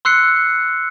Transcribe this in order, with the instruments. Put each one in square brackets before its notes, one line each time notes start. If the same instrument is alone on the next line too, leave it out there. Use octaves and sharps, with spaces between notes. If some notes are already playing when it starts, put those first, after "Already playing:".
[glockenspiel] C6 E6 F#6 C7 C#7